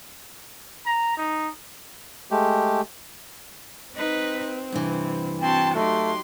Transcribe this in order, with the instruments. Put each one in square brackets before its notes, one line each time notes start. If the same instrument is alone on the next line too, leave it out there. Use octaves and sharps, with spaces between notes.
[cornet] A#5
D#4
[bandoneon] G#3 A3 G4
[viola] C4 [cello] D#4 B4
[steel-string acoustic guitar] G2 E3 [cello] C3
[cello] C4 F#4 [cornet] G5 [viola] A5 C6
[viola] F#3 C6 [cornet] A3 [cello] D#4 G4